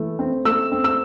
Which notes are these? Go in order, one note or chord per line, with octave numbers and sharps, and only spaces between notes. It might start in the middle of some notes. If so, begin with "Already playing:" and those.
Already playing: E3 A3
C4
A3 E6
C4
E6